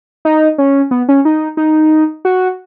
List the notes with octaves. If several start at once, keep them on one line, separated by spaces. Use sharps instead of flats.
D#4
C#4
B3
C#4
D#4
D#4
F#4